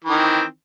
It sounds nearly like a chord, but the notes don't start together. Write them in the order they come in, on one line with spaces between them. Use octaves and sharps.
E3 D#3 C4